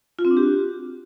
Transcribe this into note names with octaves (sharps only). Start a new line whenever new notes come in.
F4
C4
D4
G4
F#4